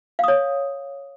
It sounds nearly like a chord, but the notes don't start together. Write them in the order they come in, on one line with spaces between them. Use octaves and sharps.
F5 D#6 C#5